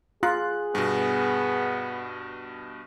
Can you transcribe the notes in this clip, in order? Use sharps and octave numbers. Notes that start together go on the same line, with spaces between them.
F4 G#4 F#6
G2 B2 B3